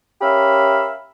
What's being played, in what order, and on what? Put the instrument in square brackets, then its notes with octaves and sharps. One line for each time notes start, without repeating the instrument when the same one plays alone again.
[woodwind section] C#4 G4 A#4 E5 F5 B5